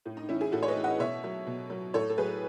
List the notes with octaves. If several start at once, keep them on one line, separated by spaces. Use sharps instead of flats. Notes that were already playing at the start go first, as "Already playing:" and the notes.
A2
D#4
E3 C#4 E4
E4 G#4
A2 F#4 A4
C#5
B4 D#5
E3
D#5 F#5
B2 C#5 E5
F#3
B2
F#3
A2 A4 C#5
A4
F#3 G#4 B4